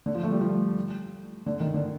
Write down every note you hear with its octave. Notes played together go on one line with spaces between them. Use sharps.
D3
F3
A3
G3
F3
D3
D#3
D3